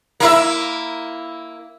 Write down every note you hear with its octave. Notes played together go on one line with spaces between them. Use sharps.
A#3 E4 E5